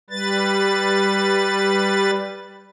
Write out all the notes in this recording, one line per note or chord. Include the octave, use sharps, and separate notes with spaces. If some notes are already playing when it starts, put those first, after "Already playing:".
G3 B4 A6